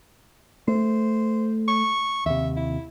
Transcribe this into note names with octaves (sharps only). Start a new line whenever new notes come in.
A3 C5
C#6
D#2 C3 E5
E4